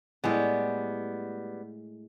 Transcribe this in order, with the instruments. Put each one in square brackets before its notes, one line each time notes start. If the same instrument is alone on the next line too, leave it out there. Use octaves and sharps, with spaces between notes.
[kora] A2 G#3 D5 [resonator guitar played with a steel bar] G3 B3